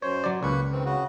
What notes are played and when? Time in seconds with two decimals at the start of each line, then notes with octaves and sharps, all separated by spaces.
0.02 F#2 C5 C#5
0.24 F#3 D5
0.43 C#2 A#3 B4 C#6
0.72 D#3 E3 C4
0.85 C#3 F#4